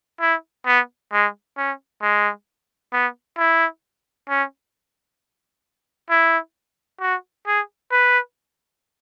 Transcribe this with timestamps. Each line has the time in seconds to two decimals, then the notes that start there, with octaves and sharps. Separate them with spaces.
0.21 E4
0.66 B3
1.13 G#3
1.57 C#4
2.02 G#3
2.93 B3
3.38 E4
4.29 C#4
6.10 E4
7.01 F#4
7.47 G#4
7.91 B4